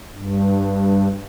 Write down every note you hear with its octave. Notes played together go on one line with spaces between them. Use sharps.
G2